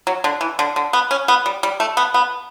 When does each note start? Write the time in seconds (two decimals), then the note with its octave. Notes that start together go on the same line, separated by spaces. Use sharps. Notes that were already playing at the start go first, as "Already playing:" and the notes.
0.07 F#3
0.24 D3
0.41 E3
0.59 D3
0.76 D3
0.93 B3
1.11 C#4
1.28 B3
1.46 G3
1.63 G3
1.80 A3
1.97 B3
2.14 B3